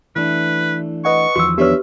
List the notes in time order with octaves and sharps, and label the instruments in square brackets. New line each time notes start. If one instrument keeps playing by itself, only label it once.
[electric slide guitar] E3 A3 D4 [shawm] B4
[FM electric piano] B4 D#5 F#5 [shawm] C#6
[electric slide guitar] E2 D#3 F3 [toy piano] F#4 E6
[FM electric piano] B3 D4 C#5 [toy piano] G4 B4 [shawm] E5